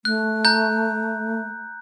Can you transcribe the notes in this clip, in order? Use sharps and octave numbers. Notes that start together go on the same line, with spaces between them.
A3 F#6
A#5 F#6 G6